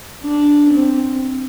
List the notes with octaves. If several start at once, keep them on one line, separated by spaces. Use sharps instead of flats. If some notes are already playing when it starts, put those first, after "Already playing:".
D4
C4